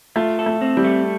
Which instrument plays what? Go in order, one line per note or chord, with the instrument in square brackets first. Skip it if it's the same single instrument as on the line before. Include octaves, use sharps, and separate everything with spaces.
[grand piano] A3 [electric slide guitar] F4
[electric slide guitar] A4
[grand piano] A3
[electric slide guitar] C4
[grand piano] G3
[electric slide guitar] A3